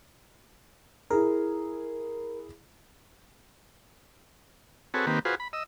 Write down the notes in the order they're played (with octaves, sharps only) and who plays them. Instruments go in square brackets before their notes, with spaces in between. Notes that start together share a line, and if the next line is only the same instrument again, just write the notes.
[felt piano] E4 G#4 [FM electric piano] A#4
[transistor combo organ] C4 F#4 G#4 A4 B4 C#5
D#3 A#3 C4 G4 B4
F4 F#4 G#4 B4 C5
B5
D#5 E6